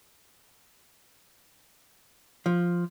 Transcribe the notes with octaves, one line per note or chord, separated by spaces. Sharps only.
F3